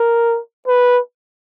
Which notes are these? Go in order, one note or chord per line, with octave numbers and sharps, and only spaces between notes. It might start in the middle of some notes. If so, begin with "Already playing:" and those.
Already playing: A#4
B4